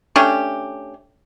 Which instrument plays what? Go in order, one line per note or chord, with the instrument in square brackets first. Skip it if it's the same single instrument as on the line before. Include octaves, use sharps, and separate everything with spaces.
[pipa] A3 C#4 D4 G4